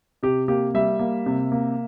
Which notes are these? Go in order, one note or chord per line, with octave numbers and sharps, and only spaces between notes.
C3 G4
A#3 G4
G3 E5
A#3
C3
A#3